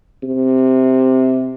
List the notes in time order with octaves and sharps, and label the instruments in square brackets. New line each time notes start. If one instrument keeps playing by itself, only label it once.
[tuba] C3